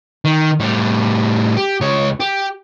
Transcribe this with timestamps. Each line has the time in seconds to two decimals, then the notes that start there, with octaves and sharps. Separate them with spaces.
0.25 D#3
0.60 A2 G3
1.57 G4
1.80 C#2 C#5
2.20 G4